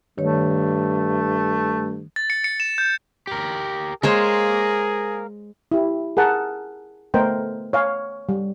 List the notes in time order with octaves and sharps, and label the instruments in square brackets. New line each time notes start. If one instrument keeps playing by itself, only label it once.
[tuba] G2 [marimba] D#3 C#5 [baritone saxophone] A3
[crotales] A6
C#7
C#7
E7
G6
[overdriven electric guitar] G4 A#4
[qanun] G#3 C5 C#5 [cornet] G#4 [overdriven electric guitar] A#4 F5
[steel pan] E4 G4
G#4 A#4 F#5 A5
A3 B3 A#4 C5 D#5 G5
C#5 F5 G#5
G3